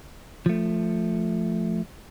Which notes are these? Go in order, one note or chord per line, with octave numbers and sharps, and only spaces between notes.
F3 A3